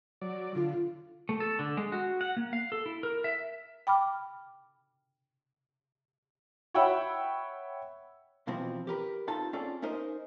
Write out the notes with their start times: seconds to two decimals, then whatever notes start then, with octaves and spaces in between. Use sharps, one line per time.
0.21 F#3 D5
0.55 D3 F4
1.29 A3
1.40 A4
1.59 D3
1.77 G#3
1.92 F#4
2.21 F#5
2.37 A#3
2.53 F5
2.72 A4
2.86 E4
3.03 A#4
3.24 E5
3.87 G5 B5 D6 F6
6.74 C#5 E5 F#5 G5 B5 E6
8.47 B2 E3 F3 C4
8.87 G4 A#4 B4
9.27 C4 D#4 F4 A4 A5
9.53 C4 C#4 F4 G#4 A4 D5
9.82 C#4 D#4 A#4 C5 D#5